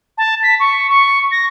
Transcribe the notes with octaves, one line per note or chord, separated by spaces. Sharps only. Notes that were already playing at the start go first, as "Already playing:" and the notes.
A5
B6
C#6
C#6
A#6